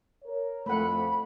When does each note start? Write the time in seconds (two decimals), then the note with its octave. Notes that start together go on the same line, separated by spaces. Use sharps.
0.24 A#4 C#5
0.66 F2 A3 F#5 B5